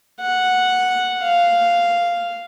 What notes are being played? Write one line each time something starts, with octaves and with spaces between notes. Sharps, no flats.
F#5
F5